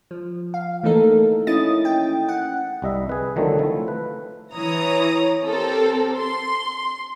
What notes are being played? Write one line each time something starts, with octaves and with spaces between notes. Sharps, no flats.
F3
F5
E3 A3 A#3 D#4 A4 A#4
C#4 E4 D#5 D#6 A6
G5
F#5
C2 G3 D#5 E5
G#4 B4
D3 D#3 F3 F#3 A3 C4
F3 A3 E4
B4
E3 E4 C#5 A#5 D#6
C4 G4 A4 A#4
C6